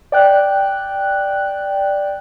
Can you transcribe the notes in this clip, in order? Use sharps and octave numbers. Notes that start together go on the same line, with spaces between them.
D5 G5 F#6